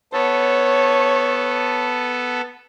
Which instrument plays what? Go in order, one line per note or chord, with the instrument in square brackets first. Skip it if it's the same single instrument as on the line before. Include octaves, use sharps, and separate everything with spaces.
[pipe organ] B3 A4 [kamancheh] C#5